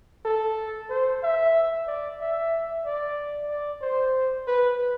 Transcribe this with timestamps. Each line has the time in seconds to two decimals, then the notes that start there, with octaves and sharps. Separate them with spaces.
0.25 A4
0.90 C5
1.23 E5
1.87 D5
2.20 E5
2.85 D5
3.50 D5
3.82 C5
4.47 B4